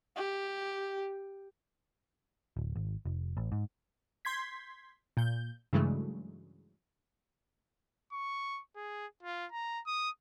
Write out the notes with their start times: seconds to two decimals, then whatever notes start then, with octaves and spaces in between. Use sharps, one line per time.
0.16 G4
2.57 D1
2.76 G#1
3.06 F1
3.37 A1
3.52 G#2
4.25 C6 G6 G#6 B6
5.17 A#2 G6
5.73 G2 C#3 E3 F#3 G#3 A3
8.13 C#6
8.76 G#4
9.23 F4
9.52 A#5
9.86 D#6